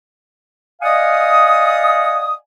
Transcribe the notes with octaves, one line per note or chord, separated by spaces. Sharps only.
D5 D#5 F5 F#5 G#5 D#6